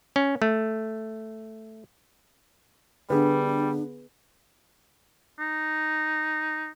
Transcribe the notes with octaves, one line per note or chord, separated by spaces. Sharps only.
C#4
A3
D3 G3 B3 D4 G#4 B4
D#4